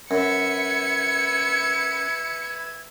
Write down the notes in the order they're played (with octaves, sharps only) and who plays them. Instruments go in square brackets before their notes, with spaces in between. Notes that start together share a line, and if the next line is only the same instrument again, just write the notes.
[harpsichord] F#2 [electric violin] B4 E5 [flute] G#6 [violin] C#7